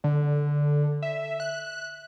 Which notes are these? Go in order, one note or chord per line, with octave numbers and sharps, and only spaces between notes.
D3
E5
F#6